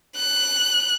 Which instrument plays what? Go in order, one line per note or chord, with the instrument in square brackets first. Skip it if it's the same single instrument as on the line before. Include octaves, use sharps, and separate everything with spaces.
[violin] F#6